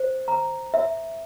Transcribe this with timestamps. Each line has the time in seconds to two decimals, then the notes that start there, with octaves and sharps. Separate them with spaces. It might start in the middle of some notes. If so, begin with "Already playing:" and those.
Already playing: C5
0.28 A#5
0.74 E5